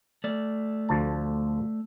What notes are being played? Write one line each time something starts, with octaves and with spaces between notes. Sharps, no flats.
A3 D5
D2 F3 A5